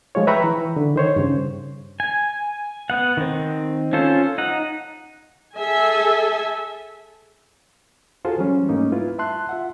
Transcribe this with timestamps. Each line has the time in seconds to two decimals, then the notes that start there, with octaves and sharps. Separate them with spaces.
0.15 F3 G#3 F4 C#5
0.27 B4 E5 G5 A#5 B5 C#6
0.44 E3
0.76 D3
0.96 D#3 C5 C#5
1.16 G2 C#3
2.00 G#5
2.90 B3 F#5
3.17 D#3 C4
3.93 C#4 F4 A4 C5
4.38 D#4 F#5
5.56 G#4 A4 E5 G#5
8.25 F4 F#4 G#4 A4 C5
8.38 E3 F#3 G3 C#4
8.69 G#2 G3 A3 A#3 C#4 D#4
8.92 E4 F4 B4
9.19 E5 A5 C6 F#6
9.49 F4 E5 F#5